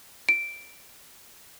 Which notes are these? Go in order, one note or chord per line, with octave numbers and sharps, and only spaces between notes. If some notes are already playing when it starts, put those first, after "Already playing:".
D7